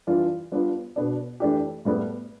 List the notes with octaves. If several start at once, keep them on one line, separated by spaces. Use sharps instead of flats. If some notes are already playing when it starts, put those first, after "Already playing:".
E3 G3 D4 F4
G3 B3 D4 F4
B2 B3 D4
E3 A3 D4 G4
A2 G3 B3